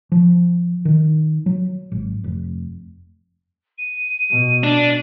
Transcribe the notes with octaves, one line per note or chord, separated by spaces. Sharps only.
F3
D#3
F#3
G#1
F1
D#7
B2
D4